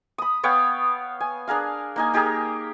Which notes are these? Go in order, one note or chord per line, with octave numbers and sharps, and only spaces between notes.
B5 D#6
B3 C#5 F5 G5
G#5
D4 G#4 A#4 F5
A#3 D#4 G#5
D#4 G4 G#4 A#4